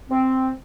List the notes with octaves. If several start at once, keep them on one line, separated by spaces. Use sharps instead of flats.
C4